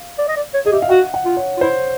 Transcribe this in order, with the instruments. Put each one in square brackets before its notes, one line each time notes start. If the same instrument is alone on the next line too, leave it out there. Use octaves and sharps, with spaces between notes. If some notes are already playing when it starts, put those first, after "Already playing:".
Already playing: [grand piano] F5
[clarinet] D5
D#5
D5
C#5
[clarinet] G#4 [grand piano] D#5
[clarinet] G4 [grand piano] E5
[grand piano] F5
[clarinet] F#4 [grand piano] F#5
[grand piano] F#5
[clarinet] F4
[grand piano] C#5
[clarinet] F4
[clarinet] E4 [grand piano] C5